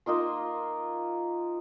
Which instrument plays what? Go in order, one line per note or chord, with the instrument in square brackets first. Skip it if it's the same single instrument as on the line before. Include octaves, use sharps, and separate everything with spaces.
[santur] A#3 D#4 F4 C6